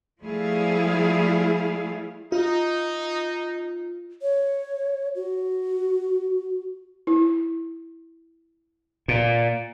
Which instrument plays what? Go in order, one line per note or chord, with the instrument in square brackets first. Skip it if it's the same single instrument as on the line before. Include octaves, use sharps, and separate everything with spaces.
[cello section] F3 G3 A3 E4 G#4 F5
[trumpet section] D#4 [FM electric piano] F4
[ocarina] C#5
F#4
[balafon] E4
[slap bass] A#2